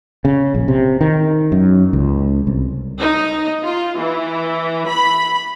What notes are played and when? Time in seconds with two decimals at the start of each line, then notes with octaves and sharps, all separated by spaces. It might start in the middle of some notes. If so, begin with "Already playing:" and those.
0.25 C#3
0.54 A#1
0.68 C3
1.01 D#3
1.52 F#2
1.93 C#2
2.47 C2
3.00 D#4
3.64 F4
3.98 E3
4.87 B5